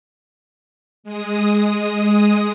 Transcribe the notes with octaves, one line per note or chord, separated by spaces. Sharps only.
G#3 D#6